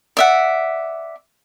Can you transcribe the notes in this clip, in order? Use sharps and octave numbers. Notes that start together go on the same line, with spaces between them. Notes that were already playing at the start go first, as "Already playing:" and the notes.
D5 E5 F#5